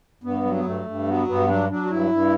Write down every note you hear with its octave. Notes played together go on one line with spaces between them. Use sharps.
G2 B3
F#3
B3
G2 A3
G2
F#3 B3
G2 B3
F#3 D4
F#3 D4
F#4
G2 E4
G2